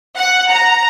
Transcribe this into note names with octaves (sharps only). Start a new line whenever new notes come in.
F#5
A#5